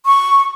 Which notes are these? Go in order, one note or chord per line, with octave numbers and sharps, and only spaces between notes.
C#6